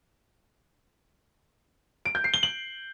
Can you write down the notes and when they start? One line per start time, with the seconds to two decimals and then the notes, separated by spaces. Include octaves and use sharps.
2.06 D7
2.15 G6
2.24 C7
2.34 G7
2.43 F#7